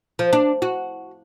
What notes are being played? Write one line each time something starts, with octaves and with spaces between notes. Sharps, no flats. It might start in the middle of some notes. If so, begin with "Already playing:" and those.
F3
D4
F#4